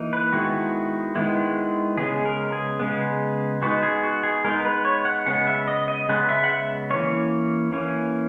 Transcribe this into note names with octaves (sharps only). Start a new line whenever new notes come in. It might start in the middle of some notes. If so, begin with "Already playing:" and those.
Already playing: E3 A#3 D#4
B4
D#3 G#3 B3 E4 F#4
D#3 G#3 B3 E4
C#3 G#3 B3 G#4
A#4
G#4
C#3 G#3 B3
G#3 B3 D#4 F#4
G#4
F#4
G#4
G#3 B3 D#4 A#4
B4
C#5
F#5
C#3 G#3 B3 F#5
E5
D#5
D#5
C#3 G#3 B3 F#5
E5
F#5
E5
E3 A#3 C#4 C#5
E3 A#3 C#4